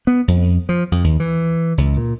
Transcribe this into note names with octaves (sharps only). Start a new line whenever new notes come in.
B3
F2
F3
F2
D#2
E3
C#2
A#2